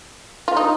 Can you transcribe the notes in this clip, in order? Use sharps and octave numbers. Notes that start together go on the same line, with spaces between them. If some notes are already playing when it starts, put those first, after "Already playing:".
F4
D#4